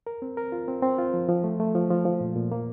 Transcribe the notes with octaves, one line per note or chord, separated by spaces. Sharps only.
A#4
C4
A#4
F4
C4
C4
F4
F3
F3
A3
A3
F3
F3
F3
A#2
A#2
A#3